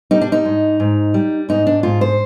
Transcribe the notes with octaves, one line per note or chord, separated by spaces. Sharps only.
G3 D#4
D4
D#4
G#2
G#2
G3
G#2 D#4
D4
G#2 F4
C5